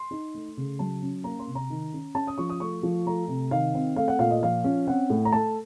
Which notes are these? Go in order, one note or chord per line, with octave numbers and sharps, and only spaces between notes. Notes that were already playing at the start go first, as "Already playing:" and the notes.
Already playing: C6
D#4
A3
C#3
F#3 A5
C#4
A#3 A#5
C6
C3
A#5
D#3
C#4
C#4 A5
D#6
F3 C#6
D#6
A3 C#6
F3
A3 A#5
C3
D#3 F5
C4
A3 F5
F#5
A#2 F5
D#5
F3 F5
C#4
C4 F#5
A2
A#5
A3 A5